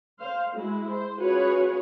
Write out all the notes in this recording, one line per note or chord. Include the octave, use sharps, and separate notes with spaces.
C5 F5
G#3 E4 F#4
C5
C#4 F4 F#4 G#4 B4 C#5